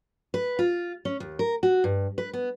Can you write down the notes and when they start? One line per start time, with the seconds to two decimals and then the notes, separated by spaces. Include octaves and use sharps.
0.34 B4
0.59 F4
1.05 C#4
1.20 D#2
1.39 A#4
1.63 F#4
1.84 G2
2.18 B4
2.33 B3